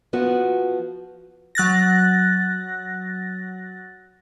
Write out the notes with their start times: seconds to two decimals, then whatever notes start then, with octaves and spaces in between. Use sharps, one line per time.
0.13 F3 B3 F#4
1.55 F#3 F#6 A6 A#6